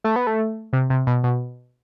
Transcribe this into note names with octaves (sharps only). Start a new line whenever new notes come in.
A3
B3
A3
C3
C3
B2
B2